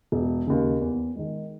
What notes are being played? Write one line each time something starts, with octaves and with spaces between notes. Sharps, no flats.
E1
D#2 C#3
E2
D#3 G#3